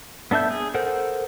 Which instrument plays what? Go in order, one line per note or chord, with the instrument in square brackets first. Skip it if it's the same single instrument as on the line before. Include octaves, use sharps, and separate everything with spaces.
[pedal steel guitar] B3 D4 A4 E5 G6
G#4
A4 A#4 C5 F#5